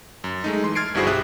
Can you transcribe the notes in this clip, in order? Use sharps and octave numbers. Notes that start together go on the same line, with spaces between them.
F#2
G#3 A3 D#4
E3 C6
F6 G#6 A6 C7 D7
G1 G2 E4 F#4 G#4 C5
B1 G4 E5 D#6 F#6